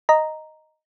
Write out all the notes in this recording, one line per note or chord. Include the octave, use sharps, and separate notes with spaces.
D#5 A#5